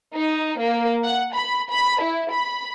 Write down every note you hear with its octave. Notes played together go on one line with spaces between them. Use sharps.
D#4
A#3
F#5
B5
B5
E4
B5